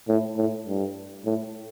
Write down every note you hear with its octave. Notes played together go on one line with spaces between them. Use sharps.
A2
A2
G2
A2